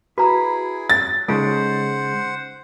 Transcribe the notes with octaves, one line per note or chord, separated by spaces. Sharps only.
E4 F#4 G#4 B4 A#5 B5
A6
C#3 G#3 D#4 F4 A4 C5 F#5